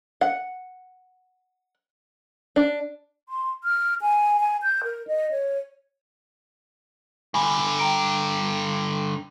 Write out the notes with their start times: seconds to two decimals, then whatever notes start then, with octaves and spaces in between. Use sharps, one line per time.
0.21 F#5
2.56 D4
3.29 C6
3.64 F6
4.02 G#5
4.40 G#5
4.63 G6
4.84 A#4
5.08 D#5
5.31 C#5
7.34 G2 D3 G#5 B5
7.79 G5 A#5 D7